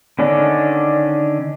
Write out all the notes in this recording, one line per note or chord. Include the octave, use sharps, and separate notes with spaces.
D3 D#3 C#4 D4